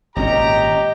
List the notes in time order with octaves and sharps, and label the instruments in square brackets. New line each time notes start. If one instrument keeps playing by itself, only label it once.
[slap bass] G#1 A#2 C#4 [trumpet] G4 [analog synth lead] D#5 [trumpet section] A#5